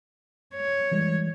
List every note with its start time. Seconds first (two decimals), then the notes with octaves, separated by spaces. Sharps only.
0.55 C#5
0.92 E3 G3 G#3